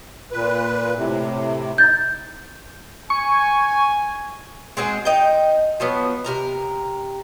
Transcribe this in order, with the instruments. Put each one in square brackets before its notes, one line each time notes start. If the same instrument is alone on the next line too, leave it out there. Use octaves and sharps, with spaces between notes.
[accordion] A#2 B4
A2 C3
[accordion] D#4 [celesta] G6 A6
[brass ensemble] G#5 [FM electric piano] C#6
[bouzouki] G#3 C4 F#4 G#4
D#4 G5
F3 F#3 B3
C3 A#4 A#5